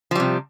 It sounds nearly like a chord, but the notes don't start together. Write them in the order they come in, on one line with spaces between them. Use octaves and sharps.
F3 G3 C3